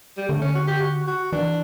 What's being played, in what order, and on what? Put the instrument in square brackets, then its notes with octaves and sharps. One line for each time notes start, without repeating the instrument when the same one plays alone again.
[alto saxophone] G3
[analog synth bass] D3 [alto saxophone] A3
[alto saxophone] C#4
F#4
G4
F#4
F#4
[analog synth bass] E3 [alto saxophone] D4